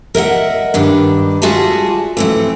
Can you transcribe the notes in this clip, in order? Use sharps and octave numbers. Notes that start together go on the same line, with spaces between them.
A#4 D#5 E5 F#5
G2 D#3 D4
G3 F4 F#4 G#4 E5 A5
E3 A3 C4